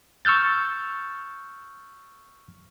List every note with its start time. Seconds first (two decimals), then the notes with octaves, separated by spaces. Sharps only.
0.25 C#6 E6 F6 G6 A6